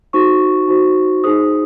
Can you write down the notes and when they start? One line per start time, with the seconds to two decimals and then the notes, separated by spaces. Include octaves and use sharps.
0.13 D#4 F#4 C5 C#6
0.68 D#4 F#4 C5
1.24 D#4 G#4 C5 D#6